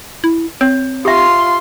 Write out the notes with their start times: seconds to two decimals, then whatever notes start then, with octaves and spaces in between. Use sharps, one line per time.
0.24 E4
0.61 C4 C#5
1.05 F4 G4 E5 C6